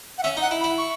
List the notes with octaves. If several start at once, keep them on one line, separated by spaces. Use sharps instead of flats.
F#5
C#4 E5
D#4 F#5
E4
B5
E4
C#6